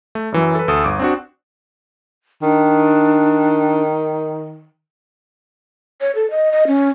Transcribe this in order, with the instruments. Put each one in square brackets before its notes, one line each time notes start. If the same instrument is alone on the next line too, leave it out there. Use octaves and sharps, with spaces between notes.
[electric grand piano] A3
F#2 E3 F#3
A4 B4
D2 A4 D#6
G1 D6
C4 D4 F#4
[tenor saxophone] D#3 [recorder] D4
[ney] C#5
A4
D#5
D#5
C#4